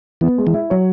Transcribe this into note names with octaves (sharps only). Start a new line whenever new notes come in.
E3 B3
G#3
E3
E4
F#3 C#5